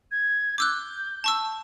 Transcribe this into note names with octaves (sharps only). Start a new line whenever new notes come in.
G#6
D6 E6 F#6 G6
A5 C#6 E6